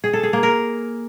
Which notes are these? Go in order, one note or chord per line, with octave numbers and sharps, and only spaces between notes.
G#4
A4
G#4
A#3
A#4